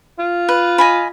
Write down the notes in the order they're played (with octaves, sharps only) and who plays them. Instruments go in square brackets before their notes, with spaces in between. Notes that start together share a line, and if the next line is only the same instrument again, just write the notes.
[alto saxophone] F4
[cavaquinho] B4
D#5 G#5 B5